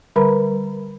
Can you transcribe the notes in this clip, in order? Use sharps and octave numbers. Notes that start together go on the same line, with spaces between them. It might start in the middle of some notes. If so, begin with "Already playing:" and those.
D3 G3 A#4 B4 A#5 B5